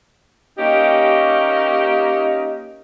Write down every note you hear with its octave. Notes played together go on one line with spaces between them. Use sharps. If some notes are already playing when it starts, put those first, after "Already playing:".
A#3 C#4 D#4 G4